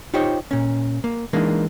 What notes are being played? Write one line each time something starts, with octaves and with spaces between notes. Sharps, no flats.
D#4 F4 G4 C5 C#5
A#2 C#4
A#3
E3 G#3 A#3 D4 D#4